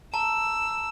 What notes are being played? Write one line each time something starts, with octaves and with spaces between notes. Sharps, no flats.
A5 A#5 E6